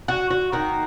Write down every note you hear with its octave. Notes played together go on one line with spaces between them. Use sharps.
F#4
F#4
D#3 A#3 F#4